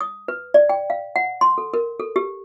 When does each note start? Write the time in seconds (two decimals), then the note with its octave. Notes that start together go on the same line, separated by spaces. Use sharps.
0.01 D#6
0.28 B4
0.54 D5
0.69 G5
0.90 F5
1.16 F#5
1.41 C6
1.58 A4
1.74 A#4
2.00 A4
2.16 G4